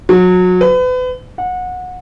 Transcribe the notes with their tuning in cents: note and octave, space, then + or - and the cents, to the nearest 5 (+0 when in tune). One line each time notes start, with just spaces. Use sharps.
F#3 -25
B4 +35
F#5 -25